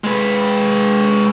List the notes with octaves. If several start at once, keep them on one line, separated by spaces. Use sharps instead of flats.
G#3 B4